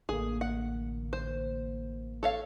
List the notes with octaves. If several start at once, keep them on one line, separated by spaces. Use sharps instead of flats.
A1 D3 A#3 G#4
F#5
C5
A4 C#5 F5